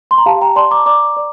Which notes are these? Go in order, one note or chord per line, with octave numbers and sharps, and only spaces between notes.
C6
A#5
G4 F5 A5
G5 A#5
D5 A5 C6
A#5 D6
D5 A#5 D6
D5